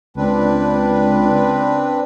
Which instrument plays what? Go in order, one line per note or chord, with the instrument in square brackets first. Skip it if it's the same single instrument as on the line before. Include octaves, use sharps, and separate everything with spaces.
[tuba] C#2 [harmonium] C4 D4 B4